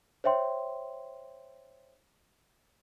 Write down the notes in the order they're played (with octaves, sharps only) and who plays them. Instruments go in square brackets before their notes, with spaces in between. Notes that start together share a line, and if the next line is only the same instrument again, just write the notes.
[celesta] C5 C#5 E5 G5 C6